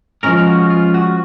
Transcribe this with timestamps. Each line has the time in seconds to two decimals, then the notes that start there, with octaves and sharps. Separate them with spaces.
0.23 F3 G#3 C#4 A#4
0.47 F#4
0.70 F4
0.94 F#4